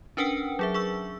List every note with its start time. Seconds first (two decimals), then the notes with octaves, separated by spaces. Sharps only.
0.17 C#4 D4 A#4 B4 F#5 G5
0.59 F#3 G#4 E5
0.74 G#4 C#6 E6